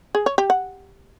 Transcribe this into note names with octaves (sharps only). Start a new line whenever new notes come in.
G#4
C#5
G4
F#5